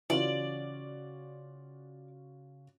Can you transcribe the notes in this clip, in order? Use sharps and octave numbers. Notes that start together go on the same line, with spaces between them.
C#3 E3 C#4 F4 F#4 D5